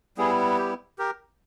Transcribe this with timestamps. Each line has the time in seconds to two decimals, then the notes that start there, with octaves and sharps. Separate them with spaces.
0.18 G3 B3 E4 G#4
0.58 G4
0.98 G4 A#4